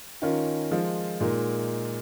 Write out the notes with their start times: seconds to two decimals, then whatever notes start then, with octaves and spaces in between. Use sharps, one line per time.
0.22 D#3 C#4 F4 A#4
0.71 F3 G#3 F4
1.20 A#2 G#3 D#4 A#4